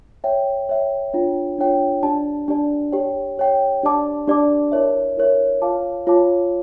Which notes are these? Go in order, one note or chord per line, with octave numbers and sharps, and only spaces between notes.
C#5 E5 G5
C#5 E5 G5
D4 F4 C#5 G5
D4 F4 C#5 G5
D4 G4 D5 A5
D4 G4 D5 A5
G4 C#5 G5
G4 C#5 G5
D4 G4 D5 A5 D6
D4 G4 D5 A5 D6
E4 A#4 C#5 E5
E4 A#4 C#5 E5
F4 C#5 F5 A5 D6
F4 C#5 F5 A5 D6